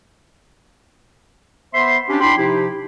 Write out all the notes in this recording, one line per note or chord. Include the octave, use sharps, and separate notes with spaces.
B3 C5 E5 C6
C#4 D4 G4
D4 E4 G5 B5 C6
C3 F3 D#4 E4 G4